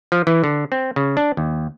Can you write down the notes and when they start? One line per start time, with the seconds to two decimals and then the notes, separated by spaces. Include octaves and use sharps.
0.12 F3
0.27 E3
0.44 D3
0.72 C4
0.96 C#3
1.17 D4
1.37 D#2